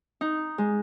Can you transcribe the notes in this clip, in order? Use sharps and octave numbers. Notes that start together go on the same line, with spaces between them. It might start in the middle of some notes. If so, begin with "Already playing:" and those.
D#4
G#3